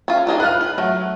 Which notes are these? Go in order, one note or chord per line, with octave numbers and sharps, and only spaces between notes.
C#4 F4
D4 D#4 G#4
F4 B4 F6 F#6
B4
F#3 A3